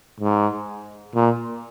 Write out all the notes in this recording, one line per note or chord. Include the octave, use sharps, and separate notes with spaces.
G#2
A#2